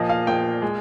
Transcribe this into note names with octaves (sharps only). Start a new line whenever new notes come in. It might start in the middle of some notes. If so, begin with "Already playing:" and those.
Already playing: A#2 F3 A#3 D#5
F5
A#2 F3 A#3 G5
G#3